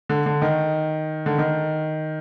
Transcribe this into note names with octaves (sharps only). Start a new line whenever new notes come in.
D3
D3
D#3
D3
D#3